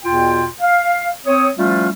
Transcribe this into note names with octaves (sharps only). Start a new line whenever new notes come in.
E2 B2 F4 G5
F5
C4 C#5 D#6
F3 G3 A3 C#4 E4 F4